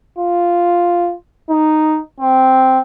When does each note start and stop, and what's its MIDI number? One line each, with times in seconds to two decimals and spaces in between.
0.18 1.15 65
1.50 2.00 63
2.20 2.80 60